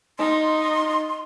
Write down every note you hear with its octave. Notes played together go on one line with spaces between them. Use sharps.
D#4 C6